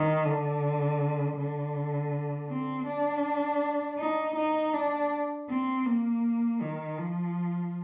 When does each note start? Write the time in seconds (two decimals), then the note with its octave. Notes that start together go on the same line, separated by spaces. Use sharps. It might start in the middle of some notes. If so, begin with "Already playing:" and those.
Already playing: D#3
0.26 D3
1.37 D3
2.49 C4
2.87 D4
3.99 D#4
4.37 D#4
4.74 D4
5.49 C4
5.86 A#3
6.61 D#3
6.99 F3